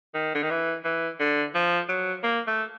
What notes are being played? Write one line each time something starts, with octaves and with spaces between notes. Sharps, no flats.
D#3
D3
D#3
E3
E3
D3
F3
F#3
A#3
A3